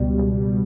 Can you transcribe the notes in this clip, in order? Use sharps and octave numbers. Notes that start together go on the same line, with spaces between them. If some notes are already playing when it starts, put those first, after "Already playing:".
Already playing: C#2 B2 G3
C#2